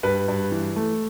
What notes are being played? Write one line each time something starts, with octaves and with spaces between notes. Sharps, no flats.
G2 B4
G2
E3
A3